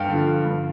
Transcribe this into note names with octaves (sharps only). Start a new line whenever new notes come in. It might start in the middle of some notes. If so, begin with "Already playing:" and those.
Already playing: G2 F5 G5
D3 F3
G2